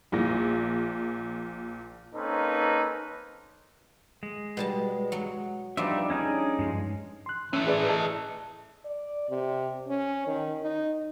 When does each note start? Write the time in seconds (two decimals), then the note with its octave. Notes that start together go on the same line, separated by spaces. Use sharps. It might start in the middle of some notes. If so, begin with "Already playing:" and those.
0.12 A#1 A#2 A#6
2.15 A#3 C4 C#4 D#4 A4 B4
4.23 G#3
4.57 B2 G3 A5
5.12 F#3
5.77 F3 G3 D4 D#4 D5 E5
6.10 C#4 D#4 G#4
6.59 G2 F3 G#3
7.26 C6 F#6
7.53 E3 A3 C#4
7.67 G#4 B4 D5
7.89 G#4 D#5 A5
8.84 D5
9.29 C3
9.88 C#4
10.26 D#3
10.62 D#4